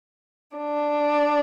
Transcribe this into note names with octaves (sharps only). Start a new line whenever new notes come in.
D4